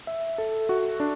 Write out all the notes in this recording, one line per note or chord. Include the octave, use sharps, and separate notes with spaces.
E5
A4
F#4
D4